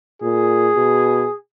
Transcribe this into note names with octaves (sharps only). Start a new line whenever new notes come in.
A#2 G#4
B2